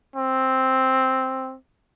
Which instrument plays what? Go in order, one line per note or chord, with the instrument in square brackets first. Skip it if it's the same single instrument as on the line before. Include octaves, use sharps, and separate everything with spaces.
[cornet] C4